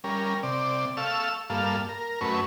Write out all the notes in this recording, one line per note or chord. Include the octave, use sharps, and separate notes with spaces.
G3 C#4 A#4
C3 D5
A4 F5 C#6 E6
G2 A#3 A4 F5
A#4
F#2 A3 C#4 B4 C#6